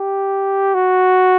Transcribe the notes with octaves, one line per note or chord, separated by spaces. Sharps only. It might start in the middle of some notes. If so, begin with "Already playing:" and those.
Already playing: G4
F#4